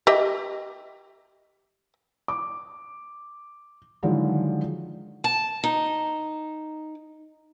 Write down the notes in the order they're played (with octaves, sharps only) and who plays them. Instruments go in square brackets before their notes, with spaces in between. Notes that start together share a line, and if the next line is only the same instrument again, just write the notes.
[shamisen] G4 D#5 E5
[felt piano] D6
D3 D#3 F3 F#3 G#3 E4
[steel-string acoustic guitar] A5
D#4